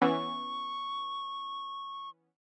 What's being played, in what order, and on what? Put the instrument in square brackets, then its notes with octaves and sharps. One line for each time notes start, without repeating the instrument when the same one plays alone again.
[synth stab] E3 B3 C#4 [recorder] C#6